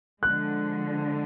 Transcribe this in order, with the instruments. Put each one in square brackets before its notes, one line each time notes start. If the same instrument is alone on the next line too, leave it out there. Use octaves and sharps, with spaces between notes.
[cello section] D3 F3 G#3 [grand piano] F#6